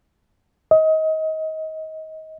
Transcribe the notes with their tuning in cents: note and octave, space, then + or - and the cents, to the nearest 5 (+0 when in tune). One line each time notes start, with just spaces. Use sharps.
D#5 +25